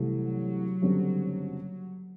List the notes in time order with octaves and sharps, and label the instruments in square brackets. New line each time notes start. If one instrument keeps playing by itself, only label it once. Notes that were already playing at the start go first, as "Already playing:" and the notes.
Already playing: [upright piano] C2 C3 E3 A3 [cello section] F#3
[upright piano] F#1 F#2 D3 G3 C4